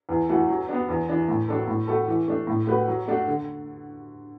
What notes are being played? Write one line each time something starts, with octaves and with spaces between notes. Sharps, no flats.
E2
E3 A3 F#4 A4
F#3
B3 D4
E2
E3 D4
A2
F#3 D4 A4
A2
A3 F#4 A4
E3
A3 D4
A2
A3 F#4 B4
F#3
A3 D4 F#4
D3